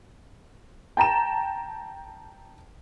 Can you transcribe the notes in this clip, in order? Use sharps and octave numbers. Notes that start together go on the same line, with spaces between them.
G5 A5 A#5 E7